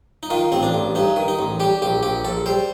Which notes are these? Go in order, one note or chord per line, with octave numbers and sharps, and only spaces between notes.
D#4
D#3 F4
A1 C4
D4
A1
G2 D#4
D#3
D#4
A1
G3 G4
A#1 G4
A#1 G4
A#1 A4
G3 C5